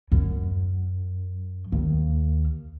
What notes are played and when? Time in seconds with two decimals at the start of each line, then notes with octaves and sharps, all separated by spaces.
0.12 F#2
1.72 D#2